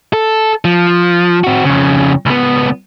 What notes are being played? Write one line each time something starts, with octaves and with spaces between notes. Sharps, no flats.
A4
F3
C4 F#4
F2 C#3
C#2 B3